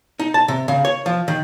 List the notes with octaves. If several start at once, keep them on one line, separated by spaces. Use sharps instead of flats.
D#4
A5
C3
C#3
C#5
F3
D#3